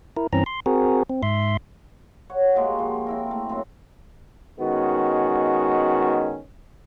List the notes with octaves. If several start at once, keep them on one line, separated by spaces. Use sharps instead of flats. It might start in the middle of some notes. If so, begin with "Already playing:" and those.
E4 A#4
G2 E3 C4 C#4 A#5
C6
C4 F#4 G#4 A#4
C4
G#2 E5 C6
C#5 F#5
G#3 A#3 F#4 G4
F3
C4 E4 A#4
A3
F#2 A#3 C4 B5
D#3 G#3 B3 C#4 F#4